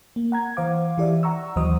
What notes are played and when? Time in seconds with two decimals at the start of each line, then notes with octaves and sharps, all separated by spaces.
0.16 A#3
0.32 F#5 A#5 G#6
0.57 E3 C5 F5 D6
0.98 E3 G4 D5 E5
1.23 F#5 A#5 C#6 E6
1.56 D#2 E3 F#3 C5 D#5 D#6